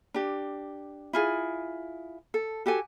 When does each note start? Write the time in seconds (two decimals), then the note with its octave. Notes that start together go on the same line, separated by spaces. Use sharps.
0.14 D4 G4
1.13 E4 F4 G#4
2.34 A4
2.66 F#4 G4 A4 G#5